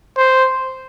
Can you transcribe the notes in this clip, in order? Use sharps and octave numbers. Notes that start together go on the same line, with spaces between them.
C5